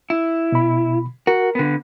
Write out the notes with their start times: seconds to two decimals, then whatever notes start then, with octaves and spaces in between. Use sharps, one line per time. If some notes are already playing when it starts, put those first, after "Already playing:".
0.10 E4
0.52 B2 B5
1.27 F#4 A#4
1.55 D3 B3